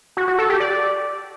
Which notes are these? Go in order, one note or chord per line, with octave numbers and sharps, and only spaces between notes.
F#4
F#4
A4
G4
D5